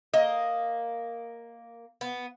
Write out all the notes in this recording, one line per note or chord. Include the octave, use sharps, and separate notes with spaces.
A#3 D#5
B3